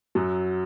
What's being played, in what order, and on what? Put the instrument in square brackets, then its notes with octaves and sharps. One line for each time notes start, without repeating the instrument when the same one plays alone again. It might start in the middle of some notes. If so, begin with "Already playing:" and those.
[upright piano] F#2 F#3